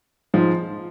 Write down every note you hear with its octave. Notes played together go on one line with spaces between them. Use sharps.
G#2 F3